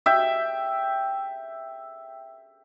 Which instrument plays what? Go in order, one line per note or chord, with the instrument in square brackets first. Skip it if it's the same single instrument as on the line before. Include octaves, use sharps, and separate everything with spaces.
[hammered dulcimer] E5 G5